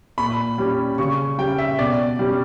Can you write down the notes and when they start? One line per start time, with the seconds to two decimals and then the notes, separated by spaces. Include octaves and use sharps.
0.18 A#2 B5
0.58 G3 C#4
0.98 C#3 C#6
1.38 G3 C#4 G5
1.58 E5
1.79 B2 D5
2.19 G3 C#4